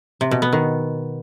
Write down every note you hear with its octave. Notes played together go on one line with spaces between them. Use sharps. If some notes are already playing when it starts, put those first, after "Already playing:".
C3
B2
B3
D#3